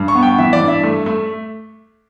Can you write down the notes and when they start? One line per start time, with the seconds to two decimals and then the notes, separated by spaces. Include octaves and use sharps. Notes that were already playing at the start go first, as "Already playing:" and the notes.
Already playing: G2
0.08 C#6
0.15 B3
0.23 G5
0.38 E3 E5
0.53 D5
0.61 G2
0.68 E5
0.83 A3
1.06 A3